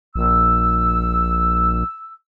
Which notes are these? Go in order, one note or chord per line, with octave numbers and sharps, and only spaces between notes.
A#1 E6